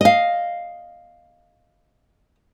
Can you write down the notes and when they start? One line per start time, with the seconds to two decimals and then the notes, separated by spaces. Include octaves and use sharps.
0.01 D#5 F5